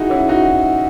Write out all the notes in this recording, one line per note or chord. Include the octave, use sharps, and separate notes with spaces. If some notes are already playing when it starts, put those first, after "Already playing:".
Already playing: D#4 E4 F#4 G#4
C#4 E4
D#4 F#4